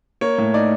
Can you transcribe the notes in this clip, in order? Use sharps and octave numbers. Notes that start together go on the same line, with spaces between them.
A#3 C#5
A2
D#4 D5